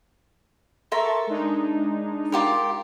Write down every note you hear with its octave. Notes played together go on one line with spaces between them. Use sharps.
A4 A#4 E5 C6 C#6 A6
G#3 D4 D#4
F4 G4 A#4